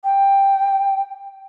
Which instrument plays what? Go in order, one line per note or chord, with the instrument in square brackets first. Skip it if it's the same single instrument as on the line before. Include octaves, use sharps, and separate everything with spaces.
[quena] G5